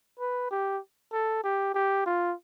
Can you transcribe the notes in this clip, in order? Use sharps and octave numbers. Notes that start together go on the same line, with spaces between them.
B4
G4
A4
G4
G4
F4